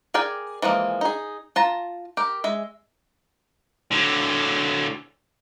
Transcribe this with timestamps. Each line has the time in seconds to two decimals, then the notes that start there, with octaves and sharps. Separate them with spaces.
0.14 G#4 A#4 D5 G5 G#5
0.62 E3 F3 G#3 A#3
1.01 D#4 G#4
1.56 F4 A5 A#5
2.17 G4 A#4
2.44 G#3 E5
3.91 D3 F#3